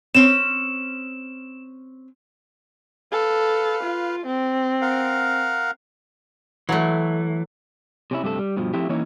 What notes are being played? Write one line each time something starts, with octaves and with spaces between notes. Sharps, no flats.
C4 C#4 E7
A4 B4 F5
F4
C4
A#4 F5 F#5
E3 F#3 A3
C3 C#4 E4
G2 C3 A3 A4
G3
G2 B2 F3
F3 A3 C4 E4 G4
E3 A#3 C#4 D#4 E4 C#5